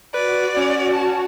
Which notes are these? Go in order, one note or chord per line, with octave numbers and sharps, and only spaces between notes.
F#4 B4 D5
C#4
A5